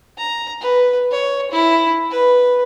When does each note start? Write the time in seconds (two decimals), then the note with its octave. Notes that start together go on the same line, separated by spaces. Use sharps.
0.17 A#5
0.61 B4
1.11 C#5
1.51 E4
2.10 B4